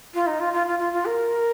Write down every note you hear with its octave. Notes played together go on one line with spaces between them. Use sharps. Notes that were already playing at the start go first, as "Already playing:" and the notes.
F4
D#4
F4
F4
F4
F4
F4
A#4